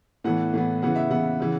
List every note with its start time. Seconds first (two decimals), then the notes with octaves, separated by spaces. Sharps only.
0.24 A2 E3 B3 F#5
0.53 A2 E3 B3
0.82 C#3 E3 B3 F#5
0.96 E5
1.10 C#3 E3 B3 F#5
1.40 C#3 E3